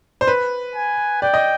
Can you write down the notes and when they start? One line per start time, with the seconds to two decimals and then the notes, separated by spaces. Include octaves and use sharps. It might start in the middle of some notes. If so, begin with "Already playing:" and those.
0.21 C5
0.27 B4
0.75 G#5
1.22 D5 G5
1.34 D#5